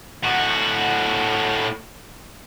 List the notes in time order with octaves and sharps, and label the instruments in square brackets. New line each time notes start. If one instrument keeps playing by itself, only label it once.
[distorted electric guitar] A2 F#4